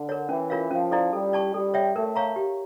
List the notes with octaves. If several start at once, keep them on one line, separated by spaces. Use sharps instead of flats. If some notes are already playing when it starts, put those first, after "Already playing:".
Already playing: D3
A#4 C#5
E3 C#4
F4 A#4 C#5 F5
F3 C#4
E4 A4 D5
G3 A4
D5 A5 C#6
G3 A4
C#5 E5 G5
A3 A#4
C#5 F5 A#5 C#6
G4